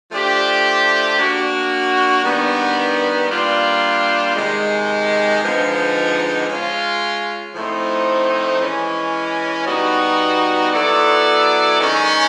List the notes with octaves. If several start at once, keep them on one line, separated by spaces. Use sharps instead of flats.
F3 A3 D4 G4
A#3 D4 F#4
D#3 G3 B3 D4
G3 A#3 D4 F4
C3 D#3 G#3
D3 F3 G#3 B3 D#4
G#3 C#4 F4
A2 F3 A3 C4 D#4
E3 G#3 C#4
B2 G3 B3 D#4 F#4
F#3 B3 E4 A4 D5
D#3 G#3 C#4